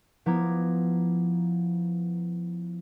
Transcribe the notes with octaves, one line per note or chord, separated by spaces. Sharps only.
F3 B3 E4 A#5 D6 G#6